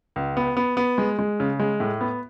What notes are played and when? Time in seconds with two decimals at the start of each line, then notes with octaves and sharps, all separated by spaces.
0.16 C#2
0.37 B3
0.57 B3
0.77 B3
0.98 G#3
1.19 G#3
1.40 C#3
1.60 G#3
1.80 A2
2.01 B3